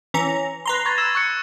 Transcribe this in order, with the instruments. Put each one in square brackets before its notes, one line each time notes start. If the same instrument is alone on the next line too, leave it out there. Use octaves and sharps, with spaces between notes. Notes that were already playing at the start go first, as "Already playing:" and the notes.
[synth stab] E3 C#4 A#5
B4 A#5 C6
[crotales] C#6 G#6 A6
E6 G#6 E7
C#6 F#6 C#7